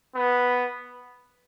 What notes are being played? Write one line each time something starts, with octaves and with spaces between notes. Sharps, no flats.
B3